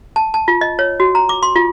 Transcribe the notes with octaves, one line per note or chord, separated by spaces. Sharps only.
A5
A5
F4
D#5
C#5
F#4
A#5
D6
C6
F4